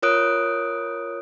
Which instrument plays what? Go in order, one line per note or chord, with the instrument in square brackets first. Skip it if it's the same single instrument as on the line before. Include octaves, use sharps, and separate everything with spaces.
[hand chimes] F4 A#4 C#5 D#6 F#6 D7